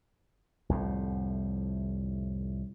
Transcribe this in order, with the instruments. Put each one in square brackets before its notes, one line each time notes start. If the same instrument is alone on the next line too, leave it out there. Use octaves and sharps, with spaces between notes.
[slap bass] C2 F2 A2